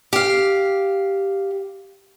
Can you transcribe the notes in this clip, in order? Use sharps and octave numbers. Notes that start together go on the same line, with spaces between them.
G4 F5